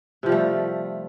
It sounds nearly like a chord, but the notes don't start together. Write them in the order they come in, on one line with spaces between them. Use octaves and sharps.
C3 F3 G3 A3